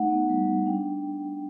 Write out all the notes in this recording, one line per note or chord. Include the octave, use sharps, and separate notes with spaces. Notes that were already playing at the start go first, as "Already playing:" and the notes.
Already playing: A3 D#4 F#5
B3
G3
G3
D4 G5